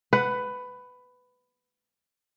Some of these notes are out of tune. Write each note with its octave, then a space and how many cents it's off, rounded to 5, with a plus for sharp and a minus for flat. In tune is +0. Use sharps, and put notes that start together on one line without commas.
B4 +15 F#5 +0